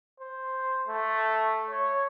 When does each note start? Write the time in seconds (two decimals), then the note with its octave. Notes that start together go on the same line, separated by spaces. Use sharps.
0.20 C5
0.87 A3
1.70 C#5